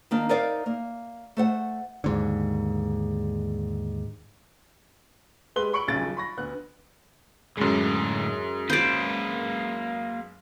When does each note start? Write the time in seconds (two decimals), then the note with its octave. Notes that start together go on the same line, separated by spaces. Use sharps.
0.11 D#3 A#3 D4
0.29 D#4 A#4 C5 D5 E5 F5
0.66 A#3
1.37 A3 C5 F#5
2.04 D#2 G#2 D3
5.56 G#3 G4 B4 C6 F#6 G7
5.73 B5 C#6 C#7 D7 F#7
5.88 D#1 B1 C#3 A6 D7
6.17 B5 C#6 A#6
6.37 D2 B3 F#6
7.57 F#2 A2 D3 G#3
8.70 A#3 B4 C5 D5